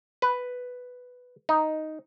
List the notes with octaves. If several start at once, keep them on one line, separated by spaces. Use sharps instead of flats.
B4
D#4